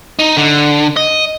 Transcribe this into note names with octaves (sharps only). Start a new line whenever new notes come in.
D#4
D3
D#5